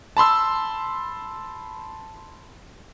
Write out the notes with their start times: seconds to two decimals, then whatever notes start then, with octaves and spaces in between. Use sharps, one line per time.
0.17 A5 B5 C6 E6